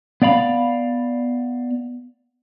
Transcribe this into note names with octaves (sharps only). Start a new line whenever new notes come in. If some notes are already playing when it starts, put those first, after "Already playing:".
B3 D5 F5 B5